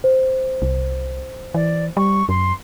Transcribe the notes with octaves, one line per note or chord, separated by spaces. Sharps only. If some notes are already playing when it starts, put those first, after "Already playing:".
C5
C2
E3 D5
G3 C#6
F#2 C6